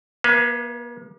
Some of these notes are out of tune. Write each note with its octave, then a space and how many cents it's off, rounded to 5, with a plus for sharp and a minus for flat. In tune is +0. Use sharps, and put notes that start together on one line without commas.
A#3 +45 B4 +10 F5 -45